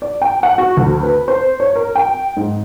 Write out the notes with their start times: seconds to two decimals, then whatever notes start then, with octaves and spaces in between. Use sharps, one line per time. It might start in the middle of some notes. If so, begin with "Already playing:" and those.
0.02 D5
0.22 G5
0.43 F#5
0.58 F#4
0.77 D2
1.03 B4
1.28 C5
1.60 C#5
1.75 A#4
1.95 G5
2.37 G#2